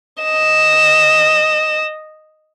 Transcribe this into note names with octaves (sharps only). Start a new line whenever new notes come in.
D#5 E7